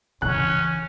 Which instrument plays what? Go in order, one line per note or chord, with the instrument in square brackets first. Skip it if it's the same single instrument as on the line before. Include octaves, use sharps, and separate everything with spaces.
[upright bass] C#3 E3 [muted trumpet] C#4 [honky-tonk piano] F#6